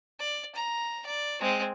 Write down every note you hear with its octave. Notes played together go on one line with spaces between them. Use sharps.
D5
A#5
D5
G#3 C4